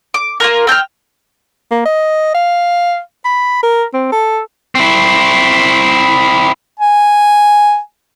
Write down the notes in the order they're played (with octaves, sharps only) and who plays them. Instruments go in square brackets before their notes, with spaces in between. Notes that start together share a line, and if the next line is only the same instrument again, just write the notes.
[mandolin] D6
A#3 F4 A#4
C4 G5 A5 F6
[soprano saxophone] A#3
D#5
F5
B5
A#4
C4
A4
[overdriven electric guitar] C4 E4
[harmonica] G#5